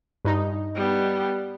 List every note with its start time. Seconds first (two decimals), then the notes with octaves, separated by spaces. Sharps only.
0.25 G2 D#4
0.75 G3 B3